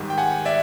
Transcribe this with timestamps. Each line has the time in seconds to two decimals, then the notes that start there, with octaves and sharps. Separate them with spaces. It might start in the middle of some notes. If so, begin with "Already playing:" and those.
Already playing: G#2 D#3 G3
0.10 G5
0.18 F#5 G#5
0.45 D5 E5